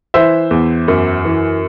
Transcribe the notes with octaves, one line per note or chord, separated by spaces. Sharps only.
E3 C5 E5
E2
F#2
E3